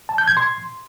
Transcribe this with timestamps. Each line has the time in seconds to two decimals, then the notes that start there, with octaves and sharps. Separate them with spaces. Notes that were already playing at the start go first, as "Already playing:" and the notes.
0.09 A5
0.18 G6
0.28 G#6
0.37 C6